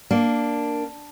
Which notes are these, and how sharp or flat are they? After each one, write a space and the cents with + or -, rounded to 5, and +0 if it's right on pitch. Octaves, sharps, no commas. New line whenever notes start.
A#3 +0 D4 +0